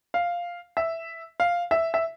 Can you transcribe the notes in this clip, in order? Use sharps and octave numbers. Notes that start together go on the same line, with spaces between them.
F5
E5
F5
E5
E5